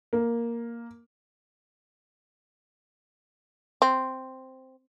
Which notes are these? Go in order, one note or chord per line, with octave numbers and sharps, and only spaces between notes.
A#3
C4